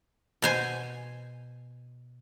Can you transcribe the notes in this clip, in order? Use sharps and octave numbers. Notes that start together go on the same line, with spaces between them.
B2 C5 G#5